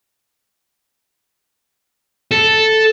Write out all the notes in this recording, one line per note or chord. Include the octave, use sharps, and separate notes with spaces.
A4